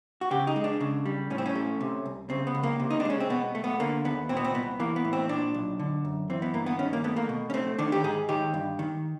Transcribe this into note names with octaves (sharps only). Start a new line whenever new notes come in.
F#4
C#3 G4
D#4
G#3
D4
C#3
G3
A2 C#4
C4
C#4
A3
C3
C2
C#3 C4
B3
C#2
A#3
C3
D#4
D4
G#3 C#4
C4
B2 B3
A3
B3
D3 A#3
D#2 B3
A#2 C4
B3
C4
C2 B3
E3 A#3
B3
A2
C4
A#2 D4
B1
D3
F#2
E3 C4
B3
G2 A#3
B3
D#3 C#4
A#3
A3 B3
A#3
B2
C#4
A3 C4
D#3 D4
G4
G#2 G#4
D#3 G4
G2
D#3